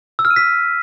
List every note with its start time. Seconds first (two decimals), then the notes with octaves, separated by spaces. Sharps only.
0.19 E6
0.25 F6
0.31 D#7
0.36 B6